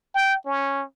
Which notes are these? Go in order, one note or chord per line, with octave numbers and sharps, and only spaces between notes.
G5
C#4